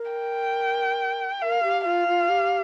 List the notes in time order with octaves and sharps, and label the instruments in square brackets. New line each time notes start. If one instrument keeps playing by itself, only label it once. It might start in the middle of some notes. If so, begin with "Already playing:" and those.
Already playing: [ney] A#4
[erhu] G5
[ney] A#4 [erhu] F5
[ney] G4
[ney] F4 [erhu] F5
[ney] F4
G4